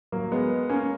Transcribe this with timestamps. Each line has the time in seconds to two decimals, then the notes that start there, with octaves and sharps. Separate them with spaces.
0.12 F#3 A#3
0.32 G#3 B3
0.69 A#3 C#4